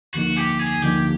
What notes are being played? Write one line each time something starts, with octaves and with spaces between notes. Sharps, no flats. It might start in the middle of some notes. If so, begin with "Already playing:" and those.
D2 D3 F3 A#3 D#4 F#4
G4
G#4
D2 D3 F3 A#3 D#4 G4